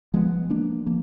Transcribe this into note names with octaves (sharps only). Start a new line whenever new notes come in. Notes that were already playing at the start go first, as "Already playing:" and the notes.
F3 G#3 B3
F3 A#3 D4
F3 A#3